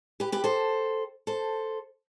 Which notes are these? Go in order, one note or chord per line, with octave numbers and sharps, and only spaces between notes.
G4 B4
G4 B4
A4 C5
A4 C5